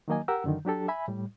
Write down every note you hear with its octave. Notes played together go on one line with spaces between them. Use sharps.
D#3 F#3 A#3 D#5 G#5
G4 A#4 F#5 E6
F#2 D3 D#3
F#3 D4 G4 A4
E5 G#5 B5
A2 G3